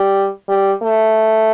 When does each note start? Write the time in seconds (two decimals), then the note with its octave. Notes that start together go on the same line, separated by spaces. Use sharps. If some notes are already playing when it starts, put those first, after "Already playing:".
Already playing: G3
0.48 G3
0.83 A3